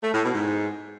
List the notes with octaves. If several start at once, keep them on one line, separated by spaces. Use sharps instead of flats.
A3
A2
B2
G#2